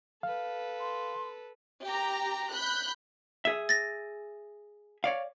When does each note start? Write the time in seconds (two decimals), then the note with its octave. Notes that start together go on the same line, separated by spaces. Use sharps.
0.23 A4 B4 F5
0.80 C6
1.85 G4 A#5
2.53 B5 F#6 G6
3.45 G#4 E5
3.69 A6 A#6
5.04 C#5 D5 F5